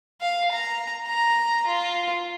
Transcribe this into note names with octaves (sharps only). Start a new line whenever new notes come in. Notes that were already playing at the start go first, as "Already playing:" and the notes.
F5
A#5
A#5
F4